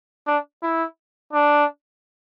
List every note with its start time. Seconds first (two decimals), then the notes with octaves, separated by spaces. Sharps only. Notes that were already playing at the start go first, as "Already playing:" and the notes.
0.27 D4
0.63 E4
1.33 D4